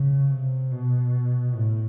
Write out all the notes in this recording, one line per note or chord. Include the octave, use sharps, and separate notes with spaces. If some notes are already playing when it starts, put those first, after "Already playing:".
Already playing: C#3
C3
B2
A2